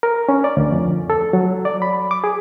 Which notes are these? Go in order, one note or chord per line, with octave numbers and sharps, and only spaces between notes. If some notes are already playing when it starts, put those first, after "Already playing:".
A#4
C#4
D5
D2
F2
A4
F#3
D5
B5
D6
G#4